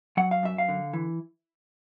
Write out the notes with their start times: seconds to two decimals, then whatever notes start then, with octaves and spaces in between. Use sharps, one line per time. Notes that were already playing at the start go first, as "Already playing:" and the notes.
0.17 F#3 F#5
0.31 F5
0.43 F#2 E5
0.58 F5
0.69 D3
0.93 E3